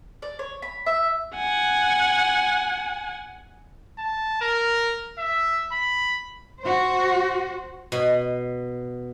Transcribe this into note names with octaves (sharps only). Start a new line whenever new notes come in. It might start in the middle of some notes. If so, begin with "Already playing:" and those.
D5
C#5
B5
E5
F#5 G#5
A5
A#4
E5
B5
F#4 C5
B2